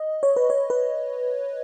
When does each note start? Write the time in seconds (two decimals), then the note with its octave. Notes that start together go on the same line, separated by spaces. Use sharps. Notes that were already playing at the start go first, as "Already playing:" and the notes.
Already playing: D#5
0.23 C#5
0.36 B4
0.50 C#5
0.70 B4